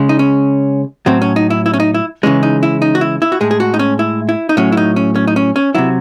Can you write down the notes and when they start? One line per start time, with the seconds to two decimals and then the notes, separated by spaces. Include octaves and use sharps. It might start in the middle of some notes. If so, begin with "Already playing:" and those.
Already playing: C#3 G#3
0.09 D#4
0.19 C#4
1.06 A2 F#3 C4
1.22 C#4
1.36 D#4
1.50 E4
1.66 E4
1.74 C#4
1.80 D#4
1.94 E4
2.23 C#3 E3 G#3 C#4
2.43 D#4
2.63 E4
2.82 D#4
2.95 F#4
3.01 E4
3.22 E4
3.32 F#4
3.41 A2 G#3 G#4
3.51 G#4
3.60 F#4
3.74 D#4
3.79 C#4
3.99 E4
4.29 E4
4.49 D#4
4.57 A2 F#3 C#4
4.72 E4
4.77 D#4
4.96 C#4
5.16 C#4
5.27 D#4
5.36 C#4
5.56 C#4
5.75 C3 F#3 E4